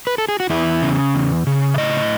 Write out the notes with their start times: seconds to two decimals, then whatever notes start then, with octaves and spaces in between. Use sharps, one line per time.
0.07 B4
0.18 A4
0.29 G#4
0.40 F#4
0.50 E2 E4
0.82 C#3
1.15 E2
1.47 C#3
1.74 E5
1.78 A2 D#5